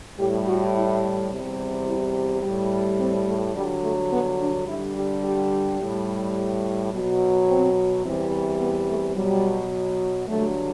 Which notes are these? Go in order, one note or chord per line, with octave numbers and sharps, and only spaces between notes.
A2 G3 G4
F#4
E4
E2 C3 G3
E4
A2 G3
C4
A3
G2 D3 F#3 G3
A3
B3
D4
G2 D3 G3 E4
G4
G4
A2 G3
B2 F#3
C4
E2 C3 E3 G3 C4
B3
A3
B2 F#3 G3
G2 D3 F#3 A3